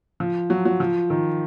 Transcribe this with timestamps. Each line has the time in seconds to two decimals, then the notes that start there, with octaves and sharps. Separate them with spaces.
0.20 F3
0.50 F#3
0.65 F#3
0.80 F3
1.10 D#3